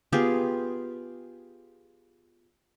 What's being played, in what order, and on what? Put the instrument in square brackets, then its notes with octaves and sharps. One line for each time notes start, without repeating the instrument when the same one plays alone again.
[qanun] B3 F4 G4 G#4